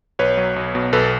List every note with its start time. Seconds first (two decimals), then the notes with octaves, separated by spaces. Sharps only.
0.19 B1 B4 C#5
0.37 F#3
0.56 B1
0.75 B2
0.93 B1 A4 B4